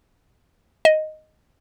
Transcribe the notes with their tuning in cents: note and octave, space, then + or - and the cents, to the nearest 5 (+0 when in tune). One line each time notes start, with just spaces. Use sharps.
D#5 +0